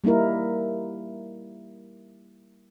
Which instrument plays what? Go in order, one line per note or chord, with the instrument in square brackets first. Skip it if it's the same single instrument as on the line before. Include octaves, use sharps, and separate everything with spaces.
[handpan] G3 A#3 D#4 E4 A#4